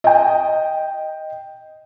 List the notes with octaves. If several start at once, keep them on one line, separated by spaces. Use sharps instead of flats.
D#5 G5